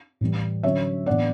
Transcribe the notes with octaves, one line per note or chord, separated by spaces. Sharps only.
A2 E3 G3
D3 F#3 C#4 C#5 E5
A2 E3 B3 D4 D5 F#5